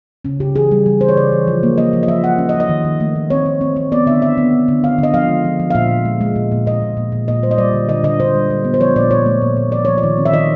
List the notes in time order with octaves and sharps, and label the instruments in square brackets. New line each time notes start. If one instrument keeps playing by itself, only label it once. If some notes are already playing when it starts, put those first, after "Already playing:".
[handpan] C#3 C#4
C#3 G4
E3 G#4
G3
G3
E3 C5
C#5
C#3 D5
E3
F3
A#3
A#3 D#5
F3
D#5
F3 E5
A#3 F#5
C#4
D#5
F3
D#5
D#3
D#3
A3
D#3
C4 C#5
C4
C4
C4
B3 D5
D3 E5
D3 E5
B3
D3
D3
D3 F5
D3
D#5
F3 F5
G#3
F3
F3
F5
A#2 E5
A#2
G#3
G#3
A#2
A#2
A#2 D#5
A#2
A#2
A#2
A#2 D#5
G3 C5
D#5
G3 D5
D3
D3 D#5
D3 D#5
D3 C5
G3
G3
B3
C5
F3 C#5
A#2 D5
A#2 C#5
A3
A#2
A#2
F3 D5
F3 C#5
D5
D#3
C4
E5
D#3 D#5